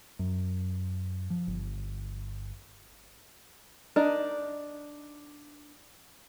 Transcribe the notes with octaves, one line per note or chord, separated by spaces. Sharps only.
F#2
F3
G1
D4 D#4 A#4 D#5